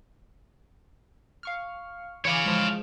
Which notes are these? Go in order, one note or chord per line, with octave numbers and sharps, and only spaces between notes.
F5 C#6 F6
E3 C#5 F5 G#5 D6
F3 G#3